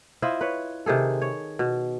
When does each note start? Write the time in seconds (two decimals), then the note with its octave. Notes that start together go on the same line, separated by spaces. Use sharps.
0.22 E4 F4 C5 D#5
0.41 B4 C#5
0.86 C3 D#3 G#4 A4
1.22 C#5
1.59 B2